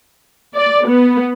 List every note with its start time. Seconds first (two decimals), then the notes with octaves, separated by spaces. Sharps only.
0.56 D5
0.88 B3